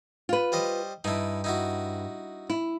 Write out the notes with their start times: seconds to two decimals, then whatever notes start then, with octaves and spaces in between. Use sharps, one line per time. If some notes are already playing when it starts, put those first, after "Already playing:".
0.29 F4 B4
0.52 G3 C5 D#5
1.04 G2 D#4 E4
1.44 D#4 E4 F#4
2.50 E4